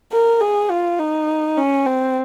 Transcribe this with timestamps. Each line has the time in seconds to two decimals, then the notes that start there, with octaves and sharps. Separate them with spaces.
0.12 A#4
0.41 G#4
0.70 F4
0.99 D#4
1.57 C#4
1.86 C4